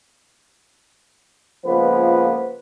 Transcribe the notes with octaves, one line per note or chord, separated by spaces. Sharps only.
C#2 F3 A#3 B3 B4